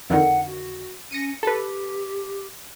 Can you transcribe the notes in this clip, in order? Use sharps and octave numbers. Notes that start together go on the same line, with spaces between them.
F2 D3 D#3 F#5
F#4
C#4 A#6 C#7 D#7
G4 A4 B4